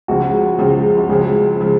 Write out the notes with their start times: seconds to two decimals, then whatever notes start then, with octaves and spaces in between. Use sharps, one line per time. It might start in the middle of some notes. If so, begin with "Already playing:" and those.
0.08 C#2 C#3 F3 F#4
0.59 C#2 C#3 F3
0.98 F#4
1.09 C#2 C#3 F3 G#4
1.61 C#3 F3